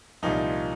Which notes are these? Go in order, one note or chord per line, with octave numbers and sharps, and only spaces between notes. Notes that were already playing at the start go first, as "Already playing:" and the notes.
C2 A#2 F3 D#4